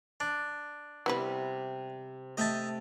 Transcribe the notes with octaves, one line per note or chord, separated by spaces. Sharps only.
D4
C3 G3 B3 E4 B4
C3 A3 D#5 E5 G5 A5